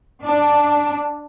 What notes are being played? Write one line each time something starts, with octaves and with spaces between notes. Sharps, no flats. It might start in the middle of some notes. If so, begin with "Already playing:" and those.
D4